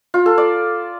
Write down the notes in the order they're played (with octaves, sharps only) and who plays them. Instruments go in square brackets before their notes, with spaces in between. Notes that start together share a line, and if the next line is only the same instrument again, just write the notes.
[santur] F4
A4
D5